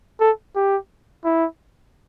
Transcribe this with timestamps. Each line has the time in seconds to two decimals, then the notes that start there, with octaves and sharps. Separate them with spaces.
0.20 A4
0.56 G4
1.25 E4